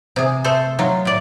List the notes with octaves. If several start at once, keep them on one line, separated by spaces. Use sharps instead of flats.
C3 G#4
A3 A4 C5
F#3 F4
A2 D5